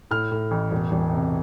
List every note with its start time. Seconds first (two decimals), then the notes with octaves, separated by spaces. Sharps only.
0.11 A2 F6
0.32 A2
0.51 A1
0.71 E1
0.92 E1
1.13 C3